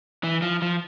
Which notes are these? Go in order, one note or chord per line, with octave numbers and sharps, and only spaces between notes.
E3
F3
F3